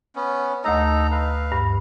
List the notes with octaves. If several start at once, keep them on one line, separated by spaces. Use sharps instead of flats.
B3 C#4
D2 A3 D#4 A4 D#5 A#5
B4 F5
G2